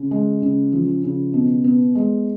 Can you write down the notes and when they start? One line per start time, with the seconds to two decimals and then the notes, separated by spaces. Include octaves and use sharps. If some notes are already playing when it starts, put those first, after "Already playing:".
Already playing: C#3
0.11 G#3
0.42 C#3
0.72 F3
1.04 C#3
1.34 B2
1.64 B3
1.95 G#3